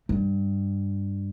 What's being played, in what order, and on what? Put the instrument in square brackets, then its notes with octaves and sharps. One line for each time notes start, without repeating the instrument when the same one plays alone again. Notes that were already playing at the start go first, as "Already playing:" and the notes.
[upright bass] G2